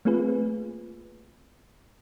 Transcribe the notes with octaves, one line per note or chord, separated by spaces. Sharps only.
A3 A#3 C4 F4 G#4 B4